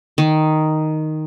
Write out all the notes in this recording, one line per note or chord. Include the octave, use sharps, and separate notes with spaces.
D#3